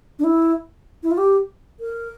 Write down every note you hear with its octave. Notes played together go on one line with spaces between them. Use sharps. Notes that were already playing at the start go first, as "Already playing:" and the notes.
D4
E4
E4
F4
G4
A#4